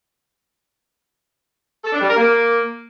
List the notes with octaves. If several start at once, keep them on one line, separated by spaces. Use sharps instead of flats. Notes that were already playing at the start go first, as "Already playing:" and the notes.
A4
D4
G3
A#4
A#3